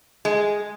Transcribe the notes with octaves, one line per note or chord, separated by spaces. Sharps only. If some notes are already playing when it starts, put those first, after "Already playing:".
G#3